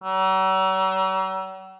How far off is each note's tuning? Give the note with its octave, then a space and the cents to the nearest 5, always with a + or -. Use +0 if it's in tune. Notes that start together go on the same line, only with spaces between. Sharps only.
F#3 +45